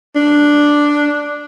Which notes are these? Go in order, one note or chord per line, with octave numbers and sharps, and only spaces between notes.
D4